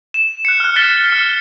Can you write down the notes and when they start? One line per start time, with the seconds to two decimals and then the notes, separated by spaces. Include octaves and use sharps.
0.14 E7
0.45 F#6 C#7
0.60 F6 F#6
0.76 F6 F#6 A6 B6 C#7 G7
1.10 F6 C#7